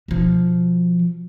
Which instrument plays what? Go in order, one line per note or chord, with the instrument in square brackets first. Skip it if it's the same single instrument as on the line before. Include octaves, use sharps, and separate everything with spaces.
[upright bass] B2 F3